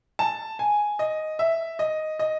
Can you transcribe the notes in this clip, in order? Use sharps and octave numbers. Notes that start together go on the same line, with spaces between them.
A5
G#5
D#5
E5
D#5
D#5